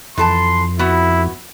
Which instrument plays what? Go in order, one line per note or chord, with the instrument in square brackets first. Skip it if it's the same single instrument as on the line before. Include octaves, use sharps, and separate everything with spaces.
[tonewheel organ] F2 [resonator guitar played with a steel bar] E3 A4 A5 [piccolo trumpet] C6
[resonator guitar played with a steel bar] B3 F#4 [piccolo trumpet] E4